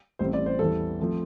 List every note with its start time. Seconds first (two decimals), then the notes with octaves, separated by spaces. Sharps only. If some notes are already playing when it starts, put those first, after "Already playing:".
0.19 A1 A2 G3 C4 C5
0.33 D5
0.46 C5
0.59 E2 E3 G3 A4
0.99 F3 A3 C4